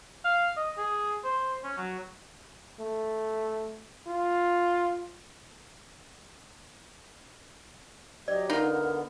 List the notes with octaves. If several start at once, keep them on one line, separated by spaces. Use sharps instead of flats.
F5
D#5
G#4
C5
C#4
F#3
A3
F4
F#3 G4 D5 D#5
D3 B3 D#4 F4 A#4